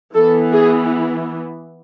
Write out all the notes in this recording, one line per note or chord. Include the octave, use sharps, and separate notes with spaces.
E3 B3 A4
G#4